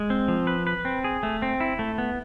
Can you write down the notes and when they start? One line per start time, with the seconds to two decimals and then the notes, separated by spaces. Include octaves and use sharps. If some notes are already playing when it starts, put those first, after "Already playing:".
Already playing: G#3
0.10 C4
0.28 F3
0.47 B4
0.67 B4
0.85 C4
1.04 G#4
1.23 A3
1.42 C4
1.60 E4
1.79 A3
1.98 B3